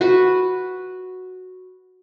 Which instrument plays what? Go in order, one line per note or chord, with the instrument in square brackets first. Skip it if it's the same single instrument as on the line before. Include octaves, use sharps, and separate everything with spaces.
[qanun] F#4 B4